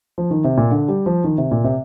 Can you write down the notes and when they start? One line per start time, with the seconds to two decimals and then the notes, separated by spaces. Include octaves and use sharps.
0.18 F3
0.31 D#3
0.44 C3
0.57 A#2
0.71 D3
0.88 G3
1.06 F3
1.24 D#3
1.38 C3
1.51 A#2
1.64 C3